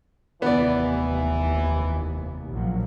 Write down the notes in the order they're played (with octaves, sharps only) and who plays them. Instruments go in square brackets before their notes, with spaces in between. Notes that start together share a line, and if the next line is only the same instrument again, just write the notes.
[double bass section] F1 D#2 [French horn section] E3 [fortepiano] B3 D5
[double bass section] A#1 F3 F#3